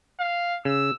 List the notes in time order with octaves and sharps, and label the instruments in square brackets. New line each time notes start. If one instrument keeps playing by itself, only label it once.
[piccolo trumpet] F5
[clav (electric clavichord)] C#3 [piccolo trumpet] E6